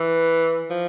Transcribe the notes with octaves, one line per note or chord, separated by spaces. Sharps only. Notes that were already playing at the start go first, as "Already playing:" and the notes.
Already playing: E3
F3